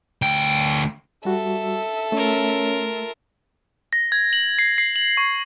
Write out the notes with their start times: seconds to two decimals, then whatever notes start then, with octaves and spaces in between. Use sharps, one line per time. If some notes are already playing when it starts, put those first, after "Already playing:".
0.22 D2 G5
1.25 G3 F#4 A4 E5
2.12 A3 C#4 F4 A#4
3.93 A#6
4.12 G#6
4.33 F#7
4.59 C7
4.78 C7
4.96 F#7
5.17 C#6